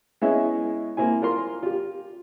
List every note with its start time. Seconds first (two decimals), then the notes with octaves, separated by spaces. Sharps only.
0.22 G#3 B3 C#4 E4 D#5 E5
0.97 A#3 C4 E4 G#5
1.22 F4 A#4 C6
1.63 F4 G4